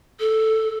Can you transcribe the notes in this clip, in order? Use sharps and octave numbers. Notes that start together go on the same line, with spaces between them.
A4